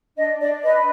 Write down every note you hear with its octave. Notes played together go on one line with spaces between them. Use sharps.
D4 D#5
D4 D5
B4 D#5